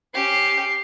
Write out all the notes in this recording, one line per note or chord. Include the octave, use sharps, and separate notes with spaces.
C#4 G4 C7